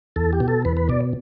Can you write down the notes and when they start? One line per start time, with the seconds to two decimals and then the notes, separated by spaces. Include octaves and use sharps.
0.16 E2 A4
0.33 G4
0.40 B2
0.48 A4
0.65 E2 B4
0.77 B4
0.89 B2 D5